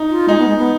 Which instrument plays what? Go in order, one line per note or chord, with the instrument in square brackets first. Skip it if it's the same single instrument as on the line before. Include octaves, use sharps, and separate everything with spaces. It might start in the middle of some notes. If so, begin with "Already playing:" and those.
Already playing: [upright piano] D#4
[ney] F4
[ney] G#3 [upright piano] D#4
[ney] B3
G#3
B3